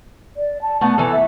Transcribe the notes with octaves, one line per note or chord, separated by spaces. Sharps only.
D5
A5
A3 B3 F#4 A5
E3 A4
E5